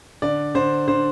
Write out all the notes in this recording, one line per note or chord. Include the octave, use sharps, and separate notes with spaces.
D3 D5
D3 C5
D3 C5